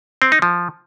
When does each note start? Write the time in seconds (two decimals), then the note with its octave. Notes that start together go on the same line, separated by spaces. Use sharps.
0.22 C4
0.32 D#4
0.42 F3